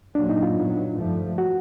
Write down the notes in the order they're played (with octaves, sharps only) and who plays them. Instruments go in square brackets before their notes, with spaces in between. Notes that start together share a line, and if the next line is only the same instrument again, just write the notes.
[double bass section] A#2 F#3 A#3 [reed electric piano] D4
[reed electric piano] D#4
F4
[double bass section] A#2 F#3 B3
G2 D3 F3 A3
[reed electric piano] F#4